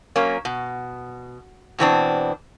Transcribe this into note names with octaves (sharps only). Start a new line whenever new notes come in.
F#3 A#3 C#4
B2
B2 E3 C4 D4